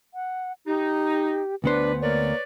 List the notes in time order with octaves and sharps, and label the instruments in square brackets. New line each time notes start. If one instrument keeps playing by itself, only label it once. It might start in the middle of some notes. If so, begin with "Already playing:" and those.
[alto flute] F#5
[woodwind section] D#4 [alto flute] G4
[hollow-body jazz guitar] D2 B3 C5 [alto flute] D4 [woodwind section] B4
[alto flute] A#3 [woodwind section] B4 C#5 D5